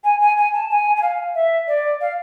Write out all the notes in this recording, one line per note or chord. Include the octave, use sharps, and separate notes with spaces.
G#5
G#5
G#5
A5
G#5
G#5
F5
E5
D5
F5